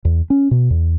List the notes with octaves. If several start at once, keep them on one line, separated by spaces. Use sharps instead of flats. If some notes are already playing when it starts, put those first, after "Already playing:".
E2
C#4
B2
E2